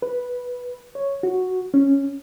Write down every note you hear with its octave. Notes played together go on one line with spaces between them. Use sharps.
B4
C#5
F#4
C#4